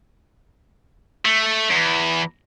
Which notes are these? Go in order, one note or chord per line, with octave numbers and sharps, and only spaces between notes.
A3
E2